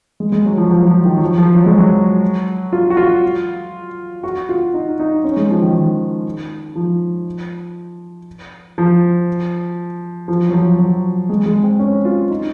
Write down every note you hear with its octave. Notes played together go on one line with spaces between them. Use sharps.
G#3
G#3
F#3
F3
F#3
F3
F3
D#3
F#3
F3
F3
F#3
G#3
F#3
F4
F#4
F4
F#4
F4
D#4
D#4
C#4
G#3
F3
D#3
D#3
F3
F3
F3
F#3
F3
F#3
G#3
G#3
C4
C#4
F4
D#4